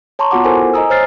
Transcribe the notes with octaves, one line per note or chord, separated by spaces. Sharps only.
C#5 A5 A#5 C6 C#6
B3 F4 F#4 F#5 D6
E4 A4 A#4 C5 G#5
D#5 G#5 A#5 D#6 E6
C5 C#5 F6 A6 C7